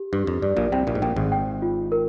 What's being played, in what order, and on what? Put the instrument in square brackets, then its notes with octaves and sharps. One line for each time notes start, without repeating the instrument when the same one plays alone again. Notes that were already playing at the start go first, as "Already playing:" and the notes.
Already playing: [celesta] G4
[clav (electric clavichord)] G2 [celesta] G4
[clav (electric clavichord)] F2
[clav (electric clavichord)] G2 [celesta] D5
[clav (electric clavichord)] A#1 A#2
[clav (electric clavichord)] C2 C3 [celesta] G5
[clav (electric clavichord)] A#1 A#2
G#2
[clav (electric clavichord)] A#1 A#2 [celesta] G5
[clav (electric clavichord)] G#1 G#2
[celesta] G5
F4
A#4